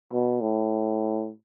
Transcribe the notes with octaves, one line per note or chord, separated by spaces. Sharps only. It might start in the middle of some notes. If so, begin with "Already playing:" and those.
B2
A2